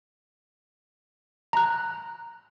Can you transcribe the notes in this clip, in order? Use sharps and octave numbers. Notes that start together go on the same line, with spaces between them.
A#5 F#6